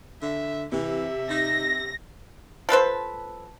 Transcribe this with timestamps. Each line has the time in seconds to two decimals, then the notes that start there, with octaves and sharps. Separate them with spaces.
0.22 D3 E5
0.72 C3 E3 E5
1.30 D#4 A#6
2.69 F3 A4 B4 C5